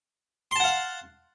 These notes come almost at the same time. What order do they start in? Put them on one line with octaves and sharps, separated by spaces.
C6 A5 F#5 F5